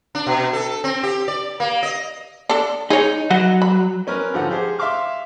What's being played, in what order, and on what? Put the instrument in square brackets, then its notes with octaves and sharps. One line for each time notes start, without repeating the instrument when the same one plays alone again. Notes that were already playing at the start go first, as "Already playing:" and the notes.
[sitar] D4
B2
A4
C4
G4
D5
A#3
D#5
[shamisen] D4 A4
[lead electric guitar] D#4 [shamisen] G#4 C#5
[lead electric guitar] F#3 [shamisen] B4 D#5 F#5
[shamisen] B5
[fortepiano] C4 C#4 A#4 B4
G#2 D3 F3 A4 F#5
G4 G#4 C5
E5 F5 C6 D6 F6